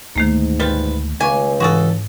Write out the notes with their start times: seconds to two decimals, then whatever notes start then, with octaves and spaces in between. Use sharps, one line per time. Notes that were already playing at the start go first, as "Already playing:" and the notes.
0.16 D2 G#2 D#3 A3 A#3
0.60 G3 F4 B4
1.20 C#2 B3 F5 G#5 C#6 D6
1.60 G#2 E3 F#4 G#4 A4